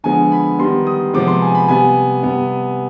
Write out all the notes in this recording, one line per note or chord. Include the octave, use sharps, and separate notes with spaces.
D3 F3 G#3 B3 G#5
B5
D#3 G3 B3 C6
D#6
C3 F3 G#3 B3 D6
C6
G#5
B5
C3 G3 B3 G#5
C3 G3 B3